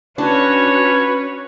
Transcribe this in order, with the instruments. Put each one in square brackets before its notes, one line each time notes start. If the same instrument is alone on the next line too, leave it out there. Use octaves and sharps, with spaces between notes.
[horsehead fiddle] C#4 F#4 [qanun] D4 [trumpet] B4 [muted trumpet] C#5